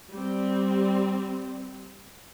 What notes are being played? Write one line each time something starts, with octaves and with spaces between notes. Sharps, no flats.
G3 C4